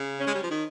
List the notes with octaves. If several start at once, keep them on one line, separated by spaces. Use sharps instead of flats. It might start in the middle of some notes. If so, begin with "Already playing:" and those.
Already playing: C#3
C#4
G#3
G3
F3
D#3